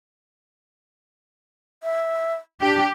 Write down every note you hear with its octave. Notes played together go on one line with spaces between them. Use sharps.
E5
D4 G4